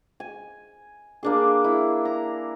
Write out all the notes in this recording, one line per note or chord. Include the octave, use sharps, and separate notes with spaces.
G#5
A#3 D4 G#4
E4
A#5